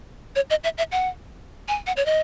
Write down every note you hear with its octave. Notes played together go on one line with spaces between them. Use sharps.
C#5
D#5
E5
E5
F#5
G#5
F#5
C#5
D#5